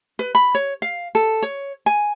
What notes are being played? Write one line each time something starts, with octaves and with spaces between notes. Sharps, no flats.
B4
B5
C#5
F5
A4
C#5
G#5